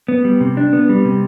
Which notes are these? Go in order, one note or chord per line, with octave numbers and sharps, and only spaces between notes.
B3
G3
C3
D4
B3
G3
C3